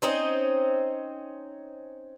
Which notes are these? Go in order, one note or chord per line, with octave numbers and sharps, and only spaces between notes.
C4 C#4 D#4 C5